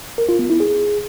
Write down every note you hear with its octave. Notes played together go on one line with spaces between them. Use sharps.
A#4
F4
B3
E4
G#4